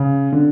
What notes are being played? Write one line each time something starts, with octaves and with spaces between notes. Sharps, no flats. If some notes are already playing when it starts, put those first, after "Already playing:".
Already playing: C#3
D3